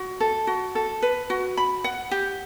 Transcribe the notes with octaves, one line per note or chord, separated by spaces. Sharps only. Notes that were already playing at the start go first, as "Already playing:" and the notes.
Already playing: F#4
A4
F#4
A4
B4
F#4
B5
F#5
G4